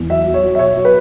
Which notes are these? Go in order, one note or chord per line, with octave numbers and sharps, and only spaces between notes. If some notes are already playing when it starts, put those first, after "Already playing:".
Already playing: E2
F#3 E5
F#3
C#5
F#3
E5
B2 C#5
F#3
B4